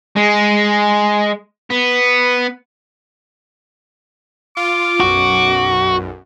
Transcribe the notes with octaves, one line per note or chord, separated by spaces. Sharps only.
G#3
B3
F4 D6
B1 F#2 F#4